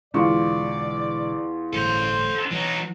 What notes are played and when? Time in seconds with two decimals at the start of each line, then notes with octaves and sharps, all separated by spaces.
0.14 E1 E2 D3 G#3 F4 D5 C#6
1.73 G1 A2 F#3 A4 C5 C6
2.51 E3 F#3 D#4